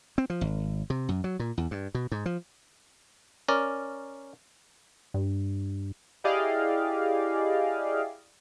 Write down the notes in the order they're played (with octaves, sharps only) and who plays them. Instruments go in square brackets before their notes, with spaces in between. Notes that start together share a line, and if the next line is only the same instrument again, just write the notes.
[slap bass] C4
F3
G#1
C3
F#2
F#3
A#2
E2
G2
B2
G#2
F3
[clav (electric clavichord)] C#4 A#4 D5
[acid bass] G2
[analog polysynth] E4 G4 G#4 D5 D#5 F5